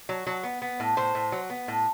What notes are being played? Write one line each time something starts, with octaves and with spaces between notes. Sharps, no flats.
F#3
F#3
B3
B3
A2
A2 C5
A2
F#3
B3
A2